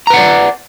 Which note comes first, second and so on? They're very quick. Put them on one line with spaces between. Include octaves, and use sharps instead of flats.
A#5 B4 F#5 D5